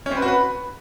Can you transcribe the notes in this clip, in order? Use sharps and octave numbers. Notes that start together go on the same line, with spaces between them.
C#4
C4
B4
F#4
B4